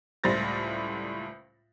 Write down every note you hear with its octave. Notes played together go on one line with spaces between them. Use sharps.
C#2 A2 G3 C5 A6 A#6